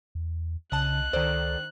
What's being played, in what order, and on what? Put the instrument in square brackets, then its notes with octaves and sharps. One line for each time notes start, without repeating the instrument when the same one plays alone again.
[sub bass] E2
[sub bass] C2 [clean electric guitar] C#3 [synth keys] D#5 A5 [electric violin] F#6
[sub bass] C#2 [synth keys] D#3 C5 [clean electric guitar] A4 D5